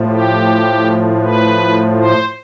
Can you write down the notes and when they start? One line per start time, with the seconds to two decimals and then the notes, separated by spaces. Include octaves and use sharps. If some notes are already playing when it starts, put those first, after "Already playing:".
Already playing: A2 F3
0.09 G4
1.22 B4
1.99 C5